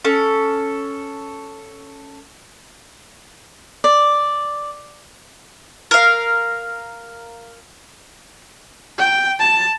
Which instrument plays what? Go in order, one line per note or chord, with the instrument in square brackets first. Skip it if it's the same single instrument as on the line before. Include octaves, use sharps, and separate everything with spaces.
[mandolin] C#4 A4
[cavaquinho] D5
[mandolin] A#4 F5
[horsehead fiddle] G5
A5